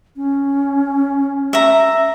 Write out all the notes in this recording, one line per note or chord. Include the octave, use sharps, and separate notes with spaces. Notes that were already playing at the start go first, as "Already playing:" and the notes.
C#4
E5 A#5